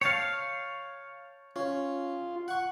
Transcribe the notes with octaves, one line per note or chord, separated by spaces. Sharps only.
C#5 F5 G5 A5
C#4 F4
F#5 C#6